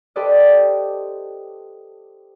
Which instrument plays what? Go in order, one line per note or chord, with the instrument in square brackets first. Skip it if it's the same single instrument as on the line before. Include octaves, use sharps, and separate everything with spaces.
[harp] G4 A4 B4 C5 D5 D#5